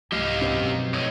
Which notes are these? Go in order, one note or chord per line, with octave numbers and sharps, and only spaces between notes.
C2 G#2 G4 D#5 F5
F#2 B2 C4
F2
A2 C#5 D#5